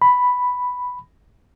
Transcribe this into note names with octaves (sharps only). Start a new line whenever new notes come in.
B5